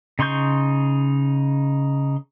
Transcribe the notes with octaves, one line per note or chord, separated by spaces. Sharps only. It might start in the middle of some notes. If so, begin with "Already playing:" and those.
C#3 D#4 C6 C#6 G6